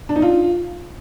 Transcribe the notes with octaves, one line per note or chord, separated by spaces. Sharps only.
D4
D#4
F4